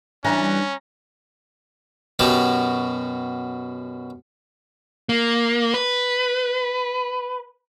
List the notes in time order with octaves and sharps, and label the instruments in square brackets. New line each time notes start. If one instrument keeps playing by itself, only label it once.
[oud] E3 G3 [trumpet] C#4 [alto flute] D4 [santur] A#5 B5
[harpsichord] F#2 B2 F#4 G4 A5
[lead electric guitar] A#3
B4